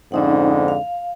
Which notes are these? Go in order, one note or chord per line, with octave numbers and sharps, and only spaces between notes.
F2 G#2 D3 C#4 D#4 F#5
F5